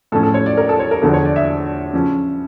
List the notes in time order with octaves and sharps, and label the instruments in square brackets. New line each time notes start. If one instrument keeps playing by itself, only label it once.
[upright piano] A2 F3 C#4 A4
A4
C#5
D5
A#4
A4
C#5
A#4
E2 D3 F3 A4
C#5
D5
E5
C#3 F3 C#4